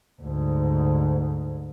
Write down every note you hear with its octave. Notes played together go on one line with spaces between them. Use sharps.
D2 G#2